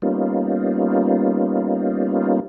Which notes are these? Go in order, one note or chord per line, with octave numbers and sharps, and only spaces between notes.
G3 A#3 B3 C#4 D#4 F4